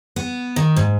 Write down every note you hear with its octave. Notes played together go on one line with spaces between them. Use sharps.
B3
D#3
G#2